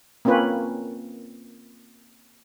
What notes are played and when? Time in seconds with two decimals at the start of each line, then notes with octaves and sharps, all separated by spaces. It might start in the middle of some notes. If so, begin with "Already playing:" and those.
0.25 A#3 C4 C#4 F4 B4 C#5